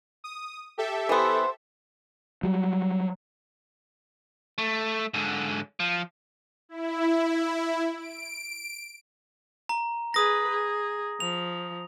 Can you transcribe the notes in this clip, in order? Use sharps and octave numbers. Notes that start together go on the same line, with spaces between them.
D#6
G4 A4 E5
E3 B3 C5
F#3 G3
A3
G#2 D3
F3
E4
D7
A#5
G#4 B4 D#6 A#6
G#4
F3 F7